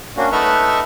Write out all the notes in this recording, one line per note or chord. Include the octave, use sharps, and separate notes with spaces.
A#3 C#4 D4 F#4
A3 D#4 B4 E5 F#5 F6